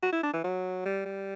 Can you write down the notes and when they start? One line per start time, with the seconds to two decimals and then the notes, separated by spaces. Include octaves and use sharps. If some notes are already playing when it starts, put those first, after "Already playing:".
0.03 F#4
0.12 E4
0.23 D4
0.33 E3
0.44 F#3
0.85 G3
1.06 G3